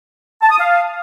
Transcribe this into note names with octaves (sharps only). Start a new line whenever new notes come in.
A5
D#6
F5